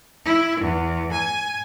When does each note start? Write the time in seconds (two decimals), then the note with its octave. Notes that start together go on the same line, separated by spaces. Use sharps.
0.23 E4
0.59 E2
1.11 G#5